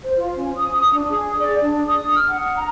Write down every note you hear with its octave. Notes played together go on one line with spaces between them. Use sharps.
C5
F4
C#4
D#6
D4
G#4
D5
D4
D#6
F6
F#5
A#5